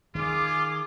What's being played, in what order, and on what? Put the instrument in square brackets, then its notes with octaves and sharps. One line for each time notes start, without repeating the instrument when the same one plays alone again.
[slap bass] D#3 [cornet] F4 [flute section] G#4 D6